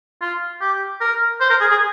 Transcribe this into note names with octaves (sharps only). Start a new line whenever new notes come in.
F4
G4
A#4
C5
A#4
G#4
G#4